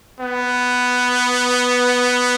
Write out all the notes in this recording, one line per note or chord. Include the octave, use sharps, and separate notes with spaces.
B3